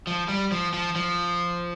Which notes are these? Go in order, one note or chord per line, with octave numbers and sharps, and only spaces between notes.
F3
G3
F3
F3
F3